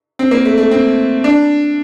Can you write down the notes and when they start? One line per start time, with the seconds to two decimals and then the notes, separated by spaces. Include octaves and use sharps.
0.19 C4
0.31 A#3
0.45 A3
0.58 A3
0.71 C4
1.24 D4